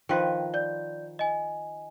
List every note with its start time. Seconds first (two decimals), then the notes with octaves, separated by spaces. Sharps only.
0.09 D#3 F3 B4 G5
0.54 D5 G6
1.19 D#5 G#5